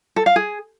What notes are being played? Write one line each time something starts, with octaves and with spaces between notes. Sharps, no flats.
A4
F5
G#4